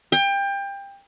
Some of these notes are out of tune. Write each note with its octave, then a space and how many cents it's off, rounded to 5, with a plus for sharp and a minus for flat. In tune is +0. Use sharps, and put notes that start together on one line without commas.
G5 +25